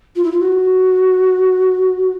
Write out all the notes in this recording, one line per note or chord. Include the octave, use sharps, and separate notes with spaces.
F4
E4
F4
F#4